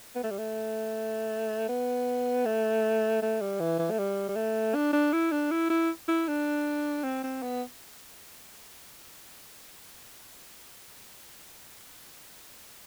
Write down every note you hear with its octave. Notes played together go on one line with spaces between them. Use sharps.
B3
A3
G3
A3
B3
A3
A3
G3
E3
E3
A3
G3
G3
A3
D4
D4
E4
D4
E4
E4
E4
D4
C4
C4
B3